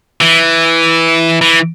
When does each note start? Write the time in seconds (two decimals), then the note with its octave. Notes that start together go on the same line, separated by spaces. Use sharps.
0.21 E3
1.41 E3